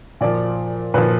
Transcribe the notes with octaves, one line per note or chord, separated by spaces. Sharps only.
A#2 F3 D5
A#2 F3 B4